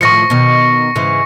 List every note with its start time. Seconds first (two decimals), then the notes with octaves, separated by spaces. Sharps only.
0.01 A2 D#3 F3 C#6 A#6 C#7
0.30 B2 D#3
0.96 G#2 C#3 E3